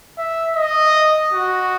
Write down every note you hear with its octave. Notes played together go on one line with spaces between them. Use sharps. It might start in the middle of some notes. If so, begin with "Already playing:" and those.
E5
D#5
F#4